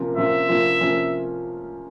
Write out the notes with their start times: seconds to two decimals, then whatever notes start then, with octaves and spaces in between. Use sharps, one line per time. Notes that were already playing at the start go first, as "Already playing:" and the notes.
Already playing: C3 F3 A#3 C#4 F4
0.16 C3 F3 A#3 C#4 F4 E5
0.48 C3 F3 A#3 C#4 F4
0.80 C3 F3 A#3 C#4 F4